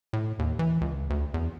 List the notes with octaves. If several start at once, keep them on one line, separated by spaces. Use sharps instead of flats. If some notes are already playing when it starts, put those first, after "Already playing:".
A2
D#2
E3
C#2
D2
E2